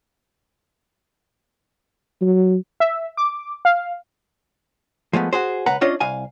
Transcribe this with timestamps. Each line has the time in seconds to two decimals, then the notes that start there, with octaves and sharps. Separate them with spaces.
2.21 F#3
2.80 E5
3.17 D6
3.65 F5
5.13 F3 G#3 A3 B3
5.33 F#4 G#4 C5
5.66 C#2 B4 F#5 A#5
5.81 C#4 D4 F4 C#5 D#5
6.00 C2 F5 G#5